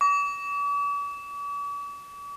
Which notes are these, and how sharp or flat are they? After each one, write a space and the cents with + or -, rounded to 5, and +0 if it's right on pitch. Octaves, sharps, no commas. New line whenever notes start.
D6 -45